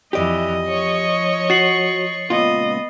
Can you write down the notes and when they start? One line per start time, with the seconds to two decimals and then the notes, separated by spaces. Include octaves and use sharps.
0.13 F2 E3 G4 D5 D#5
0.64 F3 C#5 C#6
1.50 F#4 A6 C7 F#7
2.30 C#2 A#2 B3 F4 D#5